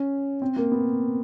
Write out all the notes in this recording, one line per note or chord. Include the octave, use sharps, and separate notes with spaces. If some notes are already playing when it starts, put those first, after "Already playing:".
Already playing: C#4
C4
A#3
B3